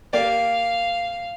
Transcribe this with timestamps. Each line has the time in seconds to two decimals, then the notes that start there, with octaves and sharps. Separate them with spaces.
0.13 A#3 G4 D5 F5